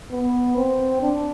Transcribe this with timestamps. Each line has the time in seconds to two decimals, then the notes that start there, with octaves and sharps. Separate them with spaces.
0.11 B3
0.57 C4
1.02 D4